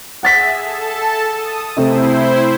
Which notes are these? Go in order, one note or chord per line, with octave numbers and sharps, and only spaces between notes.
G#4 E5 F#5 A6 B6
A4 A5
D#6
C3 A3 C4 E4 C5